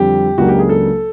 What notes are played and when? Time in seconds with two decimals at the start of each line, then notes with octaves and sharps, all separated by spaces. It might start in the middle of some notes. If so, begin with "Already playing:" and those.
Already playing: F2 D3 G3 C4 G4
0.38 C#2 C#3 F#3 A#3 D4 F#4
0.48 G4
0.59 G#4
0.69 A4